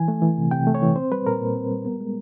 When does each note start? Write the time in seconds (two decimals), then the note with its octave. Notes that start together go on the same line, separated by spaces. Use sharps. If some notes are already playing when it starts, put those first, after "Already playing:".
Already playing: E3 G#5
0.08 A3
0.22 E3
0.37 C3
0.51 C3 G5
0.67 A3
0.75 C#5
0.82 E3
0.96 C4 C5
1.11 G3 B4
1.27 A#2 A#4
1.41 A#2
1.55 C4
1.71 G3
1.85 B3
2.01 G#3